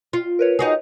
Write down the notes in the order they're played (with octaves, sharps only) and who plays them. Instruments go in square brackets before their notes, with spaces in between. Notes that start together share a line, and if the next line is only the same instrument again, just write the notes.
[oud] F4
[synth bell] A#4 B4 C#5
[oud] D#4 F#4 G#4